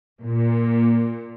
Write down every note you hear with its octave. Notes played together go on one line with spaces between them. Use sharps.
A#2